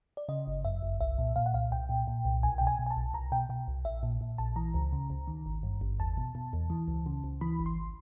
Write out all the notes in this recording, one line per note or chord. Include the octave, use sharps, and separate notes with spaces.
D5
C#3 D#5
G1
F#2 E5
G1
C2 E5
A#2
A#2 F5
F#5
C2 F5
C2 G5
A#2
A#2
C2
B1 G#5
B2 G5
G#5
B2
G#5
A5
B1
C2 A#5
B2 G5
B2 G5
C2
A#1 E5
A#2
A#2
A#1 A5
E3 A#5
C#2
C#3
C#2
D#3
G#1
G2
G#1
E2 A5
B2
B2
E2
E3
C#2
C#3
C#2
E3 B5
G#1
C6